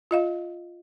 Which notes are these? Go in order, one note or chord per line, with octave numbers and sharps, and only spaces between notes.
F4 D#5 F5